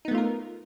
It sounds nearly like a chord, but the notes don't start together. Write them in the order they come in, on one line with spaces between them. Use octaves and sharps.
D#4 B3 A3 F4 A#4